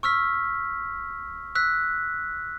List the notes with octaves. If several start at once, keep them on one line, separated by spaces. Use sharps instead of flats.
C#6 E6 F6 B6
E6 F#6 B6